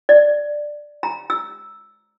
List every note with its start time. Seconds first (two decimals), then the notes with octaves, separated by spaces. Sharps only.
0.09 D5
1.03 A#5
1.30 E6